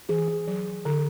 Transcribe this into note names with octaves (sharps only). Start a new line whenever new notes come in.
E3 G#4
G#4
F#3
D3